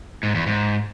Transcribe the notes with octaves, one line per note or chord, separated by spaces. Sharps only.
G#2
E2
G#2